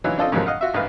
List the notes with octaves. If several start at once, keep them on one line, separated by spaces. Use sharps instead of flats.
E3 F#3 D#4 F4
C4 D4 F4 A4 C5 D#5
F2 G#2 C3 D#3 F3 F#3
D#5 F5 F#5
F4 F#4 E5
A1 G#2 G#3 G#4 B4 F5